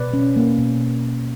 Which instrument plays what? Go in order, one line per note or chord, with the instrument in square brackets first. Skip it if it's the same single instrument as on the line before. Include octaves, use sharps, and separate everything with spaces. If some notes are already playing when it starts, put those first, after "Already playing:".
Already playing: [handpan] B2 B4 D5
C#4
A#3
B2